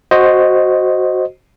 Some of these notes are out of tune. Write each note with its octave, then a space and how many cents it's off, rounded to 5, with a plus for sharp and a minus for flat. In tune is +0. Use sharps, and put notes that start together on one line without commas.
F#4 +0 C5 +5 D#5 +0